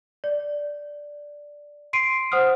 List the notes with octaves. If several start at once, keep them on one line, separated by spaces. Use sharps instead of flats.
D5
C6 C7 D7 D#7
C5 F#5 D#6 F6